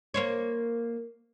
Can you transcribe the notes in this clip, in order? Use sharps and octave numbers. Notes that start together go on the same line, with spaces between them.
A#3 C5 C#5